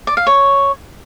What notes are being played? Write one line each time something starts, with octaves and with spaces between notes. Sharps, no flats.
D5
F5
C#5